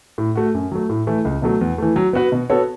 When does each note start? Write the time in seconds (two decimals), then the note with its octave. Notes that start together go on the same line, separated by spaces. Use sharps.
0.18 A2
0.35 A3 F#4
0.54 F#2
0.72 F#3 A3
0.90 A2
1.07 E3 A3 E4
1.25 C#2
1.42 B2 F#3 A3
1.61 E2
1.78 E3 A3
1.96 F#3
2.13 B3 F#4 B4
2.32 B2
2.50 B3 F#4 A4 C#5